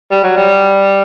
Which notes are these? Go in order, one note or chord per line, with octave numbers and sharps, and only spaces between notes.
G3
F#3
G3